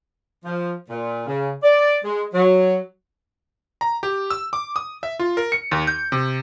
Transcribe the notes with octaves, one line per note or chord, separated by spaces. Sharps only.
F3
A#2
C#3
D5
G#3
F#3
A#5
G4
E6
D6
D#6
E5
F4
A#4
C#7
D#2
G6
C3